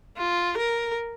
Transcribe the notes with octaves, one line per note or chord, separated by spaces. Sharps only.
F4
A#4